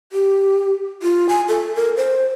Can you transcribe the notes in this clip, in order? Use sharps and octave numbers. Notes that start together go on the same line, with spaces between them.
G4
F4
G#5
A4
A#4
C5